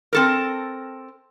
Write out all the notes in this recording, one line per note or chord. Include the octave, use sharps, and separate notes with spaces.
C4 A4 A#4